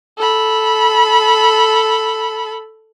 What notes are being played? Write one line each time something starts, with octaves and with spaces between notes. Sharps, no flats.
A4 B5